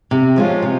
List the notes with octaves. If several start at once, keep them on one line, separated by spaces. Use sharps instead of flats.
C3
F3 G#3 C#4 F4
C3